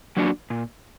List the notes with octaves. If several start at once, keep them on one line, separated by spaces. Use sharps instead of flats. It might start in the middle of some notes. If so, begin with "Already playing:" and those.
F#3 A#3 D4 F#4
A#2